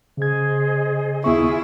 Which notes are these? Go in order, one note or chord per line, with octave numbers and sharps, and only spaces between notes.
C#3 G#4 C5 D#5 G#6
D#2 B3 E4 F4 G#4 G5 C#6